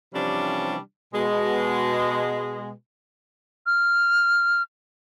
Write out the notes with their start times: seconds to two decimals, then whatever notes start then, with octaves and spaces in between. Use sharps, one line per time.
0.14 C3 E3 F3 G3 C#4 D4
1.14 B2 G#3
3.66 F6